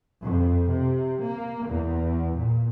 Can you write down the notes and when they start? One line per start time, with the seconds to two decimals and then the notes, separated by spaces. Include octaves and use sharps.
0.24 F2
0.68 C3
1.23 A#3
1.68 E2
2.37 A#2